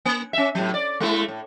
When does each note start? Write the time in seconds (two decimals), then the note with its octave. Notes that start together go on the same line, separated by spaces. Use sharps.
0.05 A#3
0.33 C#4 E5
0.55 A2 F#3
0.74 D5
1.00 G#3 A3 E4
1.28 A2